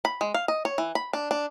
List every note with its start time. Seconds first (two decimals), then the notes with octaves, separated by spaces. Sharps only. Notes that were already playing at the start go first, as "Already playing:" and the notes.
0.05 B5
0.21 G#3
0.34 F5
0.48 D#5
0.65 C#5
0.78 E3
0.95 B5
1.13 D4
1.31 D4